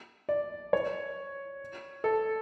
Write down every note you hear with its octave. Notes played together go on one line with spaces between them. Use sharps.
D5
C#5
A4